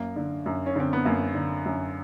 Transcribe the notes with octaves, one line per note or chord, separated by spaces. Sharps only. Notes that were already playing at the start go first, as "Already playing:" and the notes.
Already playing: F#2 A#3
D3
F#2
C#4
D3 C4
B3
F#2 A#3
D3
F#2